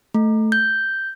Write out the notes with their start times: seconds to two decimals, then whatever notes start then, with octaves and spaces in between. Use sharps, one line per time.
0.14 A3
0.52 G6